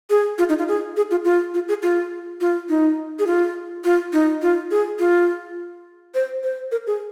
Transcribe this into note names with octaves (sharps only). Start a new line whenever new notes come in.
G#4
F4
D#4
F4
G#4
G#4
F4
F4
F4
G#4
F4
F4
D#4
G#4
F4
F4
D#4
F4
G#4
F4
C5
C5
A#4
G#4